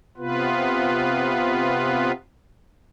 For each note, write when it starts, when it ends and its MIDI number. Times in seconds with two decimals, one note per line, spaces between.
0.17 2.12 48
0.17 2.12 59
0.17 2.12 65
0.17 2.12 71